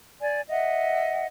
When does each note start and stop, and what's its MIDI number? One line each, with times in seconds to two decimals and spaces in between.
0.20 0.41 74
0.20 0.41 80
0.49 1.27 75
0.49 1.27 76
0.49 1.27 78